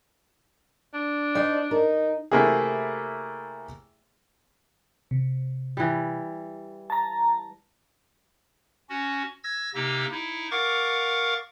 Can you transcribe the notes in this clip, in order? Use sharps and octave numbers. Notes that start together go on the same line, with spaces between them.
D4
D#4 C5 D5
D#4 A#4
C3 A3 A#3 E4 G#4
C3
E3 G3
A5 A#5
C#4 F#4
E6 G#6 A#6
C3 A#3 D#4 G4 E6
D#4 E4
A#4 F5 F#5 C#6 D6 A6